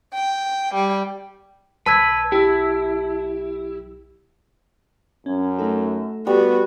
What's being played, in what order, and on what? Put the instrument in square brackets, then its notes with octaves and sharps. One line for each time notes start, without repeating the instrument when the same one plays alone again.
[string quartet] G5
G3
[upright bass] B1 [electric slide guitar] B4 [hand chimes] A5 E6 G#6
[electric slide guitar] E4 [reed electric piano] G4
[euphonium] F#2 [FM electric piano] C#4
[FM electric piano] A3 D#4 A4
[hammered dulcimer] G3 [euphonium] B3 [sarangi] F#4